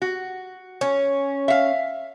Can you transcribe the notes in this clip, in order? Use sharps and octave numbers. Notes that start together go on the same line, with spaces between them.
F#4
C#4
E5 F5